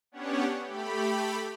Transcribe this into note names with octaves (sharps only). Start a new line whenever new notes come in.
B3 C#4 D4 G4 C#5 F#5
A3 G4 B5